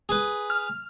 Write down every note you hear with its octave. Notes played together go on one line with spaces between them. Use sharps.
G#4 B4
F6